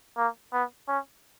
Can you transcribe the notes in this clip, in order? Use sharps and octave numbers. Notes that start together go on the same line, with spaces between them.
A#3
B3
C#4